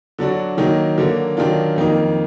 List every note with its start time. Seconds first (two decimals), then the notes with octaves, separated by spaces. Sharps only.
0.18 D3 F#3 D4 F#4
0.58 D#3 F#3 A#3 D#4
0.98 D3 F#3 A#3
1.37 D#3 F#3 D4 F4
1.76 F2 D#3 A#3 D#4